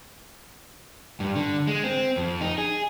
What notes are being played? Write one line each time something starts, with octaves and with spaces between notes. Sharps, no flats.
G2
D3
G#3
C4
F2
D#4
G#4